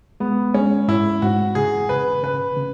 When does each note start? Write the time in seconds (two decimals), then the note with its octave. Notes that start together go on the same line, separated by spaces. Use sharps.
0.20 G#3 B3
0.54 G#3 C#4
0.88 G#2 E4
1.22 G#2 F#4
1.55 C#3 G#4
1.89 C#3 B4
2.23 C#3 B4
2.57 C#3